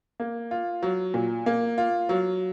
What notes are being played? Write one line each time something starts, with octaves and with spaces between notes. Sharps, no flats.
A#3
F4
F#3
A#2
A#3
F4
F#3